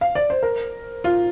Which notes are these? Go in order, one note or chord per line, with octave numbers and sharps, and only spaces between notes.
F5
D5
C5
A#4
F4